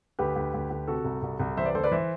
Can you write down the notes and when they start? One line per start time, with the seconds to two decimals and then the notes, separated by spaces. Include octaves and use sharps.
0.19 D2 G4 B4
0.36 D2
0.54 D2
0.70 D2
0.87 C3 F#4 A4
1.05 C2
1.22 C2
1.40 C2
1.57 E3 C5 E5
1.66 B4 D5
1.74 D2 A4 C5
1.84 B4 D5
1.91 E3 C5 E5